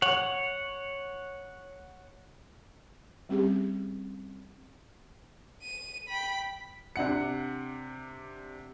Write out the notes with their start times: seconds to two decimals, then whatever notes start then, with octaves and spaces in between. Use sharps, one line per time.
0.02 C#5 F#5
3.29 G3 C4 C#4 G4 G#4
5.63 D#7
6.08 G5 B5
6.96 C3 D4 F#5 C#7